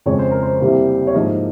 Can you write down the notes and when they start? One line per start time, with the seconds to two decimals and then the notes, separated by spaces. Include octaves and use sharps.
0.06 F2 C#3 G#3 C#5
0.19 C5
0.31 A#4
0.43 C5
0.60 C2 C3 G3 A#3
1.07 C#5
1.14 G#2 F3 A#3 D#5